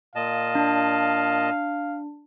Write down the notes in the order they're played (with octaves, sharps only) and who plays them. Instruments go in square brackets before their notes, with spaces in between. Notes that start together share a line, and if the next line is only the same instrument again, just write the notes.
[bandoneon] A#2 D#5 A5 [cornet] F5
[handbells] D4